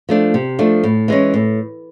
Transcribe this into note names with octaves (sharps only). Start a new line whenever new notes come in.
F3 A3 D4
C3
F3 A3 D4
A2
E3 G#3 C#4
A2